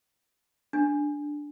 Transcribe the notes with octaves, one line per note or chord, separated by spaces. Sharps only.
D4